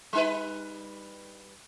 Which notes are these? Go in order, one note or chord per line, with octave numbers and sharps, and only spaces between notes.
G3 D#4 B4